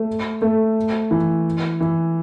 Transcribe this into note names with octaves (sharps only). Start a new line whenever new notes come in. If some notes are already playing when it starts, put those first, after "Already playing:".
Already playing: A3
A3
E3
E3